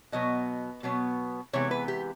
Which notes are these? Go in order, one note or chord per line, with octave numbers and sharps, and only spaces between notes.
B2 F#3 B3 D#5
B2 F#3 B3
C3 E3 G#3 B3 C#5
B4
G4